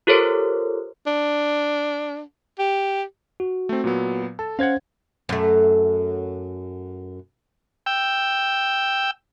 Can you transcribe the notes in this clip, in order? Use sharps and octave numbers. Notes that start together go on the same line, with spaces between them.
F4 G4 A4 A#4 C5 C#5
D4
G4
F#4
A3 C4
A#2 F#3 B3
A4 A5
C#4 C5 F5 F#5 G#6
F#2 A3
G5 E6